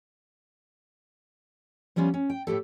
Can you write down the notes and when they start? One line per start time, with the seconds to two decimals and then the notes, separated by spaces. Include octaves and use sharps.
1.96 F3 G3 B3 C#4 F4
2.14 C#4
2.30 G5
2.47 A2 A3 G4 A4